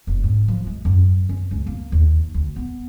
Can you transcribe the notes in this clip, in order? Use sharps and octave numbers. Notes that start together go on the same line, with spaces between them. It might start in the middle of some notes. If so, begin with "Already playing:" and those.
F1
G#2
F3
G#3
F#2
C#4
C#2
A#3
D#2
D2
B3